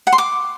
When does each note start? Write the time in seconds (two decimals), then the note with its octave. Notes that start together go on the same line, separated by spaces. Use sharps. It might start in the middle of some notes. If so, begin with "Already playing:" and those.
0.07 F#5
0.12 C6
0.18 D6